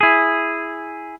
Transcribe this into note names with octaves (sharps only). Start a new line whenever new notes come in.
E4 G#4